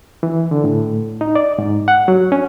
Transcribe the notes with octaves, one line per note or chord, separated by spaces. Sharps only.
E3
D3
A2
D#4
D5
G#2
F#5
F#3
C#4